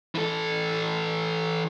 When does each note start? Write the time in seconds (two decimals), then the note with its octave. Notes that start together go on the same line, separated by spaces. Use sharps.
0.15 E3 A4